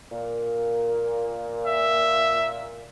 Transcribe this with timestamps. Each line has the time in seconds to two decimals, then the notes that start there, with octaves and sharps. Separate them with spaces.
0.12 A#2
1.67 E5